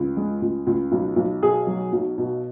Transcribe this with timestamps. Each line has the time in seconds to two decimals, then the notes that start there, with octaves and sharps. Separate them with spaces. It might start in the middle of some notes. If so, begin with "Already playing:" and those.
Already playing: C#2
0.17 G#3
0.42 C#2
0.67 C#2
0.92 B1
1.16 B1
1.42 B2 G#4
1.67 F#3
1.93 B1
2.18 B2